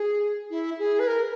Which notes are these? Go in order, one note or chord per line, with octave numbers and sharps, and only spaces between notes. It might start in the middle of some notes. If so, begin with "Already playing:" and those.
Already playing: G#4
E4
G#4
B4
A#4